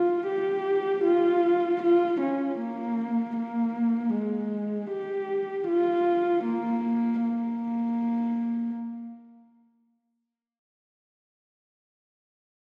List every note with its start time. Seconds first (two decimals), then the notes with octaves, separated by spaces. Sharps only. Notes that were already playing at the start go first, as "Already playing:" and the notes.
Already playing: F4
0.27 G4
1.04 F4
1.82 F4
2.21 C#4
2.59 A#3
3.37 A#3
4.14 G#3
4.91 G4
5.68 F4
6.45 A#3
7.23 A#3